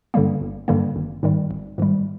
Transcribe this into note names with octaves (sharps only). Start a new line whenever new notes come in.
G2 D3 G3 A#3
G1
G2 D3 G3 A#3
G#1
G#2 D#3 G3
G#1
G#2 D#3 G3